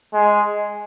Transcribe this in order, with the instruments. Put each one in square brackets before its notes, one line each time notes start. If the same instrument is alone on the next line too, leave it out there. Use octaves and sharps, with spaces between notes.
[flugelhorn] G#3